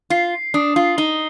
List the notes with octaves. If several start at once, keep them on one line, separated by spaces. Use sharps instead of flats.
F4 C7
D4 D#6
F4
D#4 G7